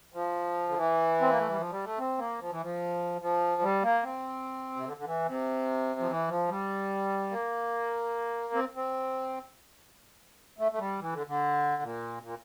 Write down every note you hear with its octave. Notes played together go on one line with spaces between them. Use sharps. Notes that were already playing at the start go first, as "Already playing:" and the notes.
F3
D3
E3
C4
A#3
A3
G3
F3
G3
A3
C4
A#3
F3
E3
F3
F3
G3
A#3
C4
C3
D3
D3
E3
C3
F3
E3
F3
G3
A#3
C4
C4
A3
A3
G3
E3
D3
D3
A#2
A#2